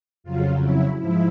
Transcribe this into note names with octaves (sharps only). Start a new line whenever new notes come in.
F2 C#3 F#3 F4
E4
G#2 F3 E4